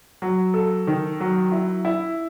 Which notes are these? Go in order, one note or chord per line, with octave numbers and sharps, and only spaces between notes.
F#3
A4
D#3
F#3
E4
E4